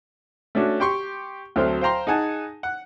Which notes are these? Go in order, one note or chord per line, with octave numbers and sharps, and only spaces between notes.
A3 C#4 D4 F#4
G4 G5 C6 C#6
D2 F#3 C4 A4 C5 F6
C5 F5 G5 A#5 C6
D#4 G#4 F#5 G#5 A5
F#5